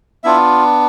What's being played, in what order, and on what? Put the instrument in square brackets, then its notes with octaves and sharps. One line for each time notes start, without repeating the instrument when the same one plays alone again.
[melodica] B3 D4 E4 F4 E5